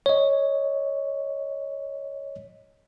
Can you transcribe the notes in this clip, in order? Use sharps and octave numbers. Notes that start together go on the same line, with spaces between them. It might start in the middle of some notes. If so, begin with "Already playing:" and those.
C#5 D#5